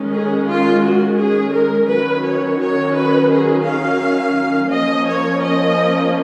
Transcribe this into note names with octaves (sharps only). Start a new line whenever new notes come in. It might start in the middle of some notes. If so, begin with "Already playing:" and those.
Already playing: D#3 G#3 C#4
G#4
F4
F#4
G#4
A#4
D#3 F#3 C#4 B4
C#5
C#5
B4
G#4
F5
F3 A#3 C#4 D#5
C#5
D#5